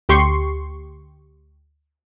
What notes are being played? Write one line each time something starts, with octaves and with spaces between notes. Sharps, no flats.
D2 G4 C6 C#6 C7